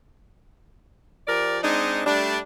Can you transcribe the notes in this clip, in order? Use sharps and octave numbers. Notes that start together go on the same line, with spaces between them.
F3 G4 A#4 D5
G#3 C4 D4 D#4
G3 A3 D4